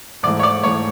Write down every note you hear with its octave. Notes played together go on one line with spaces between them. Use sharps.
G#2 E3 A3 D5
C#5
D5
G#2 E3 A3 C#5